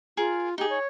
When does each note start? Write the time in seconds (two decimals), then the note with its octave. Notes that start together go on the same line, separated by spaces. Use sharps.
0.17 F4 G#4 A#4
0.58 D#4 G4 G#4
0.70 C#5